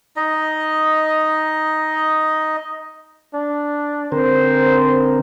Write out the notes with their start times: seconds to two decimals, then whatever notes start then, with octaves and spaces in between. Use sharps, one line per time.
0.16 D#4 D#5
3.34 D4
4.12 D3 C4 A#4 C5